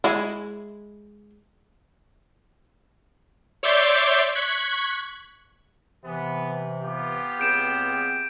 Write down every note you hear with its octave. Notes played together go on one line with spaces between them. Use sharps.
G#3 E4
C#5 D5 E5 C6 D6 G6
C#6 F#6 G#6 B6
C3 E3 B3
B3 F4 G4
C#2 C4 G#4 G6 D7 E7